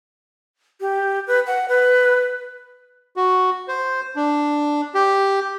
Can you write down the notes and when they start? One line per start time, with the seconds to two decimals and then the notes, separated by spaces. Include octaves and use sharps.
0.81 G4
1.27 B4
1.47 F#5
1.68 B4
3.16 F#4
3.68 C5
4.16 D4
4.95 G4